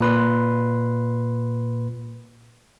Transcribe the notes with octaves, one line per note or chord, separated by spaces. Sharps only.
A#2 B4 C6